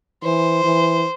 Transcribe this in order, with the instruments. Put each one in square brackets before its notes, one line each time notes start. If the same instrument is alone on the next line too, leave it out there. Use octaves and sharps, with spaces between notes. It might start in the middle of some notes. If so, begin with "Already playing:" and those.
[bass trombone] E3 [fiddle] C5
[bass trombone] E3